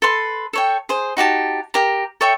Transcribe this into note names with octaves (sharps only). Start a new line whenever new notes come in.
A4 B4 C6
A4 C#5 G5
G#4 C5
D#4 F#4 G4 A5
G4 A#4 A#5
A4 C#5 E5 G5